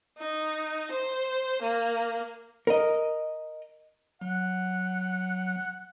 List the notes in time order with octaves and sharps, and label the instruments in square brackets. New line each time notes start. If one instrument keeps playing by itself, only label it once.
[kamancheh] D#4
C5
A#3
[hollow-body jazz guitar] A#4 D#5
[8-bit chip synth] F#3 [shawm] F#5